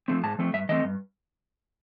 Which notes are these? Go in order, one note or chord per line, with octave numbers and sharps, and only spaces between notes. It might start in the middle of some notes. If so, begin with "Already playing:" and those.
F3 A3 C4
G#2 A5
F3 A3 C4
G2 E5
E3 A3 C4 D#5
G2